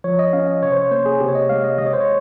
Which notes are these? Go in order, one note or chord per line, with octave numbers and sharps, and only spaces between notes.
F3 C#5
D#5
C#4 F5
D#5
C3 C#5
C5
C#5
A#3 C5
G#4
C3 G4
C#5
D#5
G#3 F5
D#5
D#3 D#5
C#5
C5
C#5